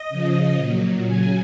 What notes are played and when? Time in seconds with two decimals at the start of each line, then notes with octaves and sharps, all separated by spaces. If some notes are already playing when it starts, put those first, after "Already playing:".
Already playing: D#5
0.09 C#3 F3
0.57 A#2 F#3
1.05 C#3 F#3 G#5